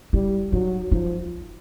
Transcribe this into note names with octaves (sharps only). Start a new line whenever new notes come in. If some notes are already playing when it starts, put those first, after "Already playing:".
G3 E4
F#3 D#4
F3 D#4